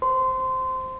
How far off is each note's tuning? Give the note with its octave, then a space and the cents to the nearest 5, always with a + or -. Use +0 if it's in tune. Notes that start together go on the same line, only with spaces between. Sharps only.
C5 +0 C6 -20